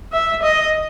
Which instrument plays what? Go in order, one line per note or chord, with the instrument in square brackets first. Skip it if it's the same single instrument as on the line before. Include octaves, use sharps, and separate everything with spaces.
[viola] E5
D#5